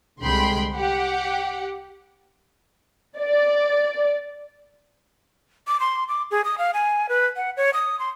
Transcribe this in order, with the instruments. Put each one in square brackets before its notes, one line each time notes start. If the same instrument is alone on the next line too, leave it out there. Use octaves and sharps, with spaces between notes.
[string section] C2 D3 G#3 G5 B5 C6
G4 F#5
[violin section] D5
[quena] D6
C6
D6
G#4
D#6
F5
G#5
B4
F#5
C#5
D#6
C6